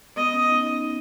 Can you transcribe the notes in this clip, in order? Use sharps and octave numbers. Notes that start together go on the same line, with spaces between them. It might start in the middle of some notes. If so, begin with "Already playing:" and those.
B3 D#5
C#4
D#4